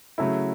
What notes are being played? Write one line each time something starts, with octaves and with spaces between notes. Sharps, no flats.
C#3 F#3 A3 E4